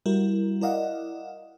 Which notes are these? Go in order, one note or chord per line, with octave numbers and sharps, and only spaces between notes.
G3 E4 F#4 A#4
E4 A#4 D5 D#5 F5 F#5